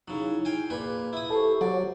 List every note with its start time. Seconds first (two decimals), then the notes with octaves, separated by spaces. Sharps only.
0.08 C#3 F#3 D#4 E4 G#4
0.45 F5 G5 G#5
0.70 A#2 F4 G#4 B4 D6
1.13 E4 D#6
1.30 G4 A4 C5 C#6
1.61 F#3 D5